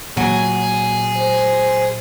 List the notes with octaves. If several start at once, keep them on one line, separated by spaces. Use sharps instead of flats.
A#2 F#3 G#4 G#5
C5